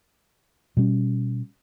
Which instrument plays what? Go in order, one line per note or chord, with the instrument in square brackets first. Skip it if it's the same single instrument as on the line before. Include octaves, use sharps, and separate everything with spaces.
[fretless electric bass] B2 G3 C#4